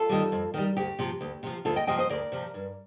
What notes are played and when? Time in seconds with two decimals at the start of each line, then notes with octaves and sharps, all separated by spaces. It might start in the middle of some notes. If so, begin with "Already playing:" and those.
Already playing: F4 A4
0.09 D#3 G3
0.32 F2
0.54 D#3 G3
0.77 D2 G4
0.99 C3 F3
1.21 D2
1.43 C3 F3
1.65 D2 F4 A4
1.76 D#5 G5
1.87 C3 F3 D#5 G5
1.98 C5 D#5
2.09 D2 A#4 D5
2.32 C3 F3
2.54 G2